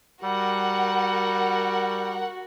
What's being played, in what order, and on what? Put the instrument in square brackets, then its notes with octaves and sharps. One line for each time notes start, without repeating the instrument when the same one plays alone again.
[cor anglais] G3 [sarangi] F#4 [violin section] A#4 F#5